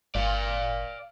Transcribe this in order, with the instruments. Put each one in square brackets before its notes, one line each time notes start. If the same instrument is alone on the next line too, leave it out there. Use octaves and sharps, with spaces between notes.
[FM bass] G1 [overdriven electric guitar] D5 F5